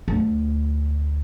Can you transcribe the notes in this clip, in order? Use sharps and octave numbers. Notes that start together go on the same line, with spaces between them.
D2